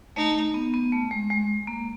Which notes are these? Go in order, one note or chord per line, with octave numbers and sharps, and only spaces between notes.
A3 D#4
A3
B3
B3
A3
G#3
G#3
A#3